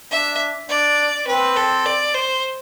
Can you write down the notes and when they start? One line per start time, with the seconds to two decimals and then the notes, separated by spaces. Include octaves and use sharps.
0.11 D4 E5
0.69 D4 D5
1.27 C4 B4
1.57 A4
1.86 D5
2.15 C5